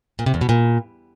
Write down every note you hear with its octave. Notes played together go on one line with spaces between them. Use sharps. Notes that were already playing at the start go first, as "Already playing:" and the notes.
A#2
C3
E2
B2
A#2